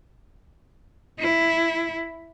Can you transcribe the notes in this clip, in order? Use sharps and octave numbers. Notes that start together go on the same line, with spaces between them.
E4